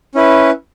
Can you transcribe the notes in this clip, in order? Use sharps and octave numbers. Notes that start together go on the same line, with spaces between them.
C#4 E4 B4